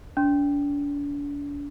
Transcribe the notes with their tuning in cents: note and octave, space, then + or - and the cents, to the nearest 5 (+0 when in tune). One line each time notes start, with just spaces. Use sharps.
D4 -40